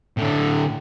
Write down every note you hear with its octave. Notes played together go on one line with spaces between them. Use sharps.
A2 D3